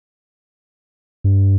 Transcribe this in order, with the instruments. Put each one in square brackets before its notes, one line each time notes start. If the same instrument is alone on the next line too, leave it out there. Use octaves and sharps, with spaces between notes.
[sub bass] G2